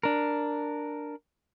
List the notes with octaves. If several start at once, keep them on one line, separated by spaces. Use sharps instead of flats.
D4 A#4